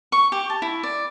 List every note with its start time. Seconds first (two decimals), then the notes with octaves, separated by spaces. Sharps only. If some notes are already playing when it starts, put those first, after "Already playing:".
0.12 C#6
0.32 G4
0.50 A5
0.62 E4
0.83 D5